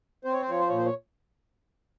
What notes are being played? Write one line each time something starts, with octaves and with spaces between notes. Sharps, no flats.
C4 C5
C#5
C5
F3 C#5
C5
A#2 C#5
C5
C#5